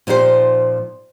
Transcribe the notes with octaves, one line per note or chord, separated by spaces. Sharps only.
A#2 F3 D#4 G4 C5